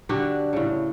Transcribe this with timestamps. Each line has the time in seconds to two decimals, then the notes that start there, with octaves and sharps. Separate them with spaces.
0.09 D3 D4 F#4 G4
0.53 A2 C#3